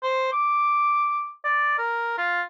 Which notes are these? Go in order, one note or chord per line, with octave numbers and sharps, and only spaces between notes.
C5
D6
D5
A#4
F4